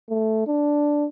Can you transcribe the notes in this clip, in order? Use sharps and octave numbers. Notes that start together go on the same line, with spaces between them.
A3
D4